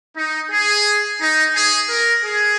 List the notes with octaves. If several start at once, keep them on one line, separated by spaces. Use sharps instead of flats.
D#4
G#4
D#4
G#4
A#4
G#4